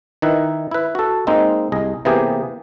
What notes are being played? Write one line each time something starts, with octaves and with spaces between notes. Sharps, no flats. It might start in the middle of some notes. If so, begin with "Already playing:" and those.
D#3 D#4 E4 B4
E4 B4
F#4 A4
G#3 A#3 C4 D#4
C2 G#4 D#5
C3 E3 A#3 B3 G4 G#4